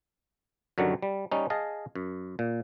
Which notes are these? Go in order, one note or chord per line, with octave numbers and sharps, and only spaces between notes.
F#2 D3 D#3 F#3 G3
G3
G3 C#4 D#4
G#4 D#5 F5 A5
F#2
A#2